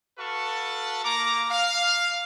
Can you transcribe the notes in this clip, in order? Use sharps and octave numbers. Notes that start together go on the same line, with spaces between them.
F#4 A4 B4 F5 A5 C#6
A#3 A#5 D6
F5